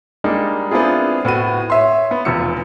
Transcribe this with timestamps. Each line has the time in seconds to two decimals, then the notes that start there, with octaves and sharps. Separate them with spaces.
0.24 G3 G#3 A#3 D4 D#4
0.71 B3 C4 D4 E4 F4 G#4
1.25 A2 B3 F#4 D#7
1.70 C#5 E5 C6
2.11 B3
2.25 F1 E2 F4 E6 C#7